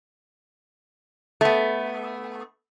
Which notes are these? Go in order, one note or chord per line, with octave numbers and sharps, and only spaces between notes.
A3 B3